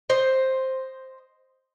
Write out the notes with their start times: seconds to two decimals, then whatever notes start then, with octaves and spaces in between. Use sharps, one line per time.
0.09 C5 D#5